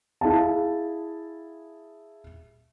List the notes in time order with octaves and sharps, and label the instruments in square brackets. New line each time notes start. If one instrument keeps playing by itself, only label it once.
[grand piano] E4 G#4 F5 A5